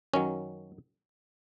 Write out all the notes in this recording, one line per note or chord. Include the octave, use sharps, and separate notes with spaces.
F#2 D#3 F#3 C#4